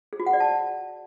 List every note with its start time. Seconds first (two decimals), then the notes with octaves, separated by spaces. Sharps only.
0.13 G#4
0.20 F#4
0.26 F#5
0.33 D5
0.40 A5